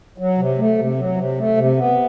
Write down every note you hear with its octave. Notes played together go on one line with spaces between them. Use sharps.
F#3
C3
A3
C3
F#3
C3
A3
C3
B3